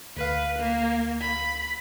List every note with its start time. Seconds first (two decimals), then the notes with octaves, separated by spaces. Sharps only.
0.17 D2 B4 F5
0.59 A#3
1.21 B5